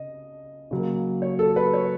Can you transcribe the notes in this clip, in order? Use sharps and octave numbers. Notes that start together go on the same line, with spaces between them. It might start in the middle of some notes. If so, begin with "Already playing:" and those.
Already playing: C#3 D#5
C#3 F#3 A#3
C#5
A4
B4
C#5